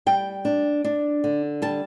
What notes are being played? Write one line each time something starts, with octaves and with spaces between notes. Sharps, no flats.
G3 G5
D4
D4
D3
G3 A5